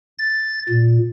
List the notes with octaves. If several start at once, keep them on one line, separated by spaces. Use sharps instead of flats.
A6
A#2